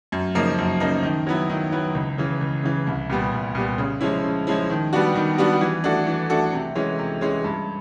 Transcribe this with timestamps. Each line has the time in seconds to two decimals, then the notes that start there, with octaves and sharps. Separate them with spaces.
0.12 F#2
0.35 C#3 F3 A#3 D#4
0.58 F#2
0.80 C#3 F3 A#3 D#4
1.03 D#3
1.27 F#3 B3 E4
1.49 D#3
1.72 F#3 B3 E4
1.95 C#2
2.18 C#3 E3
2.41 C#2
2.64 C#3 E3
2.87 C2
3.10 A#2 G3 B3
3.32 C2
3.55 A#2 G3 B3
3.78 C#3
4.01 F3 G#3 C#4 E4
4.24 C#3
4.47 F3 G#3 C#4 E4
4.70 D#3
4.93 G3 B3 D4 F#4
5.15 D#3
5.38 G3 B3 D4 F#4
5.61 E3
5.84 A3 D4 F#4 A4
6.07 E3
6.30 A3 D4 F#4 A4
6.53 C3
6.75 E3 G#3 C#4
6.99 C3
7.21 E3 G#3 C#4
7.44 G2